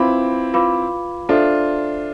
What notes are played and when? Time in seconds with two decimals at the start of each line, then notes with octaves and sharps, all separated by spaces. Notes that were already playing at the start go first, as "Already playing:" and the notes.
Already playing: C4 E4 F4 B4 F5 B5 D6
0.54 F4 B4 F5 B5 D6
1.29 D4 F4 A4 C5 E5